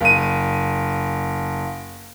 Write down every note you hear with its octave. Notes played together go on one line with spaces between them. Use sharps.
F#1 D#7